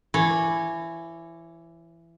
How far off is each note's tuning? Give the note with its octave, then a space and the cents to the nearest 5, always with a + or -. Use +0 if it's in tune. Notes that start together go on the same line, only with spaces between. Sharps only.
E3 +20 C#5 -15